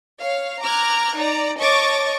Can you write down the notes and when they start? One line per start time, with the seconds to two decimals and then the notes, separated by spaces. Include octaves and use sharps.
0.20 C#5 F5
0.62 A#5 D6 F6 F#6 G#6
1.17 D#4 D5 A#5
1.59 C#5 D#5 A5 C#6 D6 A6